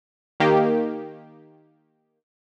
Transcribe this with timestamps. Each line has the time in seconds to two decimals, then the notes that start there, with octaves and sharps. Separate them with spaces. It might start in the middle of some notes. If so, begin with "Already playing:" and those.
0.40 D#3 A#3 G4